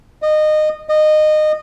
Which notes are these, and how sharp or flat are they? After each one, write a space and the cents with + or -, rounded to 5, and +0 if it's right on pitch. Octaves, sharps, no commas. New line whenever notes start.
D#5 -20
D#5 -20